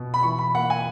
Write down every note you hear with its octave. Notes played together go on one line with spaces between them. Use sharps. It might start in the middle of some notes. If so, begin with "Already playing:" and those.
Already playing: B2
B5
E3 C#6
B5
A#3 F#5
G#5